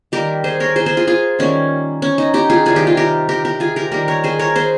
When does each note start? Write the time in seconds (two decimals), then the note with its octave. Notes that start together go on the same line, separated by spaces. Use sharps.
0.12 D#3 G3 A#3 G4 A#4
0.44 G#4 C5
0.60 A#4 C#5
0.76 G#4 C5
0.86 G#4 C5
0.97 F4 G#4
1.07 F4 G#4
1.39 D#3 G3 A#3 C#4
2.02 C#4
2.18 D#4
2.34 D#4 G4
2.50 F4 G#4
2.65 C3 D#3 G3 F4 G#4
2.76 D#4 G4
2.87 F4 G#4
2.97 G4 A#4
3.29 G4 A#4
3.45 G4 A#4
3.60 F4 G#4
3.76 G4 A#4
3.92 D#3 G3 A#3 G4 A#4
4.08 A#4 C#5
4.24 G#4 C5
4.39 A#4 C#5
4.56 G#4 C5